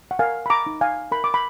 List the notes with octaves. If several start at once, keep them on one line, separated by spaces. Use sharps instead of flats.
F#5
A#4 F5 G#5
B5
A#5 D6
D#4
F5 G#5
A#4 B5
D6
B5